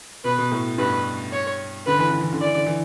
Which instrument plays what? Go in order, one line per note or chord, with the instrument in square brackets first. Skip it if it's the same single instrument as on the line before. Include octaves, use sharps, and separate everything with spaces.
[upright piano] B2 [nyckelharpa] B4
[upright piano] B2
A2
[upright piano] G2 [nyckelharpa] B4
[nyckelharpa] C#5
[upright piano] D3 [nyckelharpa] B4
[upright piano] E3
D3
E3
D3
[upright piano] E3 [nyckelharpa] D5
[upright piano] D3
E3